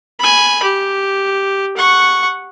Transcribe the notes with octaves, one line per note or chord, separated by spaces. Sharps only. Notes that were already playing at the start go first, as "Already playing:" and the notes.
G#5 B5
G4
F#5 C#6